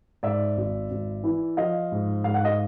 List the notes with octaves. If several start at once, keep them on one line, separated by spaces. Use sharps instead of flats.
G#2 D5 E5
G#1
G#1
E3
F3 D#5 F5
G#2
G#2 F5
F#5
D#5 F5